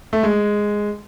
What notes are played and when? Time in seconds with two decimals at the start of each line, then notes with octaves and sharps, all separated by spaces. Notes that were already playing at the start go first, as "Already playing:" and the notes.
0.13 A3
0.23 G#3